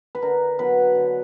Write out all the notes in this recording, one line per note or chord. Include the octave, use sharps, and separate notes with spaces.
B4
D3 A#4
F#3 B3 B4
D3